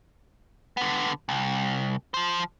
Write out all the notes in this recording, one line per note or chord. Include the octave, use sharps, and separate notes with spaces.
D3 B3
C2
F3 C5